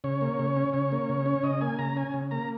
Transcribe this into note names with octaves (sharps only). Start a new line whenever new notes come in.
C#3 C#5
A#3
C#3
C#4
C#3 C#5
A#3
C#3
C#4
C#3 D#5
A#3 G#5
C#3 A#5
C#4 G#5
C#3
A#3 A#5